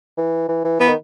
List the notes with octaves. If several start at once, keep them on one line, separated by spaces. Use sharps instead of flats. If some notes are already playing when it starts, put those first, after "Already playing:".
E3
E3
E3
E3 B3
D#3